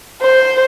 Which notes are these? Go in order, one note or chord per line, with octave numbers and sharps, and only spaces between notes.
C5